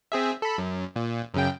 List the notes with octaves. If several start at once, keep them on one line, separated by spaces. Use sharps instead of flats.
C4 G#4 E5
A4 B5
F#2
A#2
F#2 C#3 G5